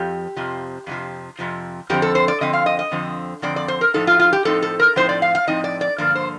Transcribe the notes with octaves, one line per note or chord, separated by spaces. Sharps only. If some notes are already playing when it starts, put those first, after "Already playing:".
Already playing: F2 F3 G4
F2 C3 F3
F2 C3 F3
F2 C3 F3
F2 D3 F3 C4 G4
A4
C5
D5
F2 D3 F3 C4 D#5
F5
D#5
D#5
F2 D3 F3 C4
F2 D3 F3 C4 D5
D5
C5
A#4
A2 F3 C4 D#4 A4
F4
F4
G4
A2 F3 C4 D#4 A4
A4
A#4
A2 F3 C4 D#4 C5
D5
F5
F5
A2 F3 C4 D#4 D#5
D5
D5
G2 D3 F3 A#3 D5
C5